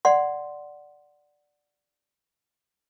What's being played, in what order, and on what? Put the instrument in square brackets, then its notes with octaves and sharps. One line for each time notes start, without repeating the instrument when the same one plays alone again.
[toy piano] D5 F#5 C6